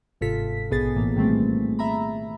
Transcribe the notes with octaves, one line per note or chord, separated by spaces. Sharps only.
G1 G#2 C3 F4 A4 B6
A#1 B2 B3 G#4 A6
A2 E3 A#3
D#3 G3 A3 C4
E5 A#5 B5